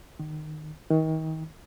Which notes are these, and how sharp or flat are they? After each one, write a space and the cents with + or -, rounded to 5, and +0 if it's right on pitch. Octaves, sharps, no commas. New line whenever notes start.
D#3 -20
D#3 +35